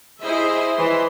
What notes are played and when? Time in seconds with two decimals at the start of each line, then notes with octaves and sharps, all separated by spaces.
0.21 E4 G#4 C5 D#5 E5
0.75 E3 C6